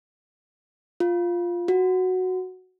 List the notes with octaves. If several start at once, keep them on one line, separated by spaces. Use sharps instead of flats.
F4
F#4